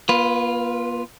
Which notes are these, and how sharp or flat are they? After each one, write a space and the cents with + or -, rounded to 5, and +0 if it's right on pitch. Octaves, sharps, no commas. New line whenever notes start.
A#3 +40 F4 +0 B4 +0